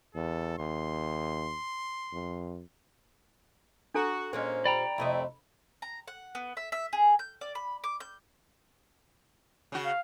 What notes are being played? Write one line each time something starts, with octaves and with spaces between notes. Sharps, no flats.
E2 A4
D#2 C6
F2
D4 F#4 A4 A#5
A#2 G#3 A#3 C4 C#4 C5
G3 D5 G5 A#5 B5
F2 C3 A3 E4 D#5
A#5
F#5
B3
E5
E5
G#4
G6
D5
B5
D6
G6
C#3 F#4
F5